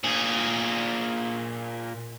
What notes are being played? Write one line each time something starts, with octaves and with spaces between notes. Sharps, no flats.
A#2 G#4